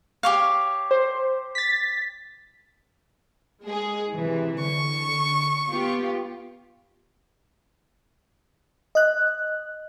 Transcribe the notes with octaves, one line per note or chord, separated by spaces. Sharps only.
G4 C#5 F5
C5
A6 B6
G#3 G#4
C3 E3
D3 C#6
B3 F4 G4
D#5 F#6